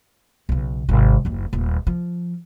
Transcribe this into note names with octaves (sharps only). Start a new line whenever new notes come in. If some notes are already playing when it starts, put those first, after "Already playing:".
B1 C#3
G#1 C3
F#1 D#2
D#1 A3
F3